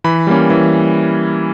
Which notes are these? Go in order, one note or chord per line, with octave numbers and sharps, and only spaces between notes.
E3 B5
G3 A#3 C#4
E3